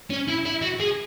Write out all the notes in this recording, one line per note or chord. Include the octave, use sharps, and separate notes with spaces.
C#4
E4
E4
F#4
G#4